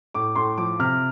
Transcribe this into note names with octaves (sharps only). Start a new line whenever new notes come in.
A2 D6
A2 C6
F3 D6
C3 F6